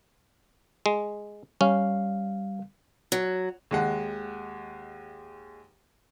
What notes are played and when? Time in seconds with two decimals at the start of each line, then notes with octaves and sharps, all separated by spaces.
0.86 G#3
1.61 G3 C#4 F5
3.12 F#3
3.71 D#2 G#3 F#5